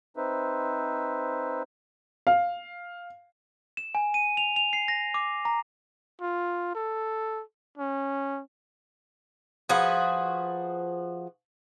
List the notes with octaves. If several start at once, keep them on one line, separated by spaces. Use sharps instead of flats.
C4 D#4 B4 C5 E5
F5
E7
G#5
D#7
F7
F7
C7
A#6
D6
A#5
F4
A4
C#4
F3 F#4 G#4 B4